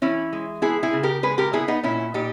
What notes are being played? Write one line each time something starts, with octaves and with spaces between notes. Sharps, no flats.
E3 C#4 E4
G#3
B3 E4 G#4
E4 G#4
C#3
G4 A#4
G#3 G#4 B4
G4 A#4
B3 E4 G#4
B3 D#4
A#2 C#4 E4
A#2 D#4 G4